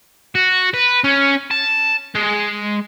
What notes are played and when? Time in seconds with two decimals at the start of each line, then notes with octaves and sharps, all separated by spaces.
0.35 F#4
0.74 B4
1.04 C#4
1.51 A5
2.15 G#3